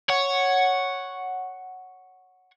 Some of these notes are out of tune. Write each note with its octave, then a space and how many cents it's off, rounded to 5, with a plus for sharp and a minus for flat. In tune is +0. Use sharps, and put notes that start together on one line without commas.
C#5 +0 F#5 +0